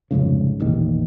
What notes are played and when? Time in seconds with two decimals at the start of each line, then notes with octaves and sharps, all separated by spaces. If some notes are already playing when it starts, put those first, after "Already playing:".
0.11 C2 F2 G#2 C#3
0.60 E1 A1 A#2 D#3